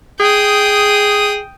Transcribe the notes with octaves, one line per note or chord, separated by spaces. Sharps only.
G#4 G5 D#6